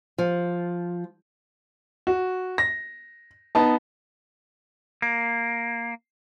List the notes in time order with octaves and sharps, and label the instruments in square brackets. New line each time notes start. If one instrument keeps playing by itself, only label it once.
[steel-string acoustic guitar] F3
[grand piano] F#4
A#6
B3 D#4 A5
[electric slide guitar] A#3